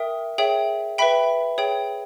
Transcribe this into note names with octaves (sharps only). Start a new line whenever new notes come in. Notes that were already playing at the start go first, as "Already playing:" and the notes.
Already playing: A#4 E5 G5 D#6
G#4 C#5 E5 G5
B4 E5 G5 B5 B6
G#4 C#5 G5